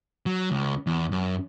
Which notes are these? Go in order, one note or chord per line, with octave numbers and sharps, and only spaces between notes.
F#3
C#2
E2
F#2